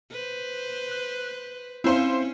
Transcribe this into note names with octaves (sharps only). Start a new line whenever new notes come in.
B4 C5
F#6
C4 C#4 E4 C5 F5 C6